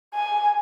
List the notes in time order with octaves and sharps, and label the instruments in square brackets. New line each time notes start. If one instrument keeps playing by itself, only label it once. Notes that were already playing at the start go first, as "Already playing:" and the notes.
[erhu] G#5